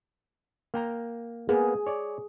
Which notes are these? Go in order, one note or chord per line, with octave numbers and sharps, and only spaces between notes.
A#3 G5 A#5
A#3 B3 G#4
C#5 D5